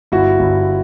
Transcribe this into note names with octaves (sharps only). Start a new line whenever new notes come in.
G1 E4 F#4
G1